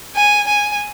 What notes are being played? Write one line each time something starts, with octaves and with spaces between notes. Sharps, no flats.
G#5
G#5